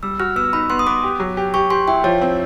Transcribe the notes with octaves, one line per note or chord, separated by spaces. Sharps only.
G3 E6
F#4 F6
B3 E6
D#4 B5
B3 C6
D#6
B3 D6
G4
F#3
G4
G4 C#6
G4 C6
E4 G5
F3 C#5
C4